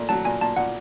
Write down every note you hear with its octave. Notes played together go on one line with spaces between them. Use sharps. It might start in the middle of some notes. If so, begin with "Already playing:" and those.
Already playing: A#2 A3
F#3 A5
A#2 G#5
A#2 A5
A#2 F#5